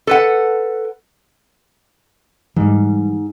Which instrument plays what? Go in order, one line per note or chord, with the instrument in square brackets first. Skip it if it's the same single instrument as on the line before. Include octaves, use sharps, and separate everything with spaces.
[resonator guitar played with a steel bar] A4 B4 F#5
[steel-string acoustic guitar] G#2 [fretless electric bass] E3 G3